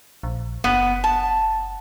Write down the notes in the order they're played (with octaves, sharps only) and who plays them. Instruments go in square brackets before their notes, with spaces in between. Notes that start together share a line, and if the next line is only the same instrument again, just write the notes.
[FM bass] A#1
[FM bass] F#1 [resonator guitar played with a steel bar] B3
[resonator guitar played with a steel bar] A5